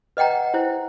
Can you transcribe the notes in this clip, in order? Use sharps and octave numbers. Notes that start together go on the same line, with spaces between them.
B4 D#5 F#5 G5 A#5
E4 C5